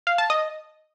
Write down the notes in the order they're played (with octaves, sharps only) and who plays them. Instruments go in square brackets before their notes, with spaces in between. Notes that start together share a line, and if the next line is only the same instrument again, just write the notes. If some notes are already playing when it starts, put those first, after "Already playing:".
[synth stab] F5
A5
D#5